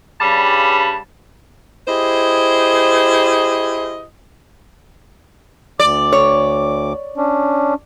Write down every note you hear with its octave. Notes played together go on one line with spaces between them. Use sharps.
G2 C#3 G3 A5 B5
E4 G4 G#4 C5 D#5
D2 D5 D6
C#5
C#4 D4